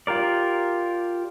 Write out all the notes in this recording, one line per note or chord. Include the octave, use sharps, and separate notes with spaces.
F4 G4 A#4 D5